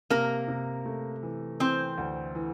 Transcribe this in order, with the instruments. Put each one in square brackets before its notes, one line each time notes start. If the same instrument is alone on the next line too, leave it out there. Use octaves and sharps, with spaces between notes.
[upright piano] C3 [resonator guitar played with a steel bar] A#3 A#4
[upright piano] C3
A3
E3
[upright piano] E3 [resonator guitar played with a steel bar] C4 C5
[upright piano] D2
E3